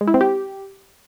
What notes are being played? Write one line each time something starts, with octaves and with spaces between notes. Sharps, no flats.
G#3
E4
C4
G4